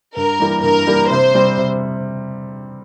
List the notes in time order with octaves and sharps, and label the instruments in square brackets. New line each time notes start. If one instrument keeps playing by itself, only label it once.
[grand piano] G2 [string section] A#4
[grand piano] E3 G3 A#3
[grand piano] G2 [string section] A#4
[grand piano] E3 G3 A#3
[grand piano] C3 [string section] C5
[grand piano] G3 C4
C3